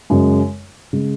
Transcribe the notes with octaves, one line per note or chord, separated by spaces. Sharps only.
F#2 C#3 G#3
C#3 G#3